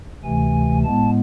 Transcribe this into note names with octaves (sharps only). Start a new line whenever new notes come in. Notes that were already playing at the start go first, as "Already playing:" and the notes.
D2 C3 E3 A3 G#5
A2 G#3 B3 A5